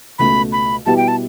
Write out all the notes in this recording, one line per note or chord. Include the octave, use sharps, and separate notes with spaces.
C#2 B2 A3 B5
B5
B2 G3 B3 E4 G4 A5
G5
A5